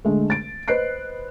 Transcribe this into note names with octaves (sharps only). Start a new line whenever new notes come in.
D3 G#3 A3
A6 D7
B4 C5 D#5 F#6 C7 D7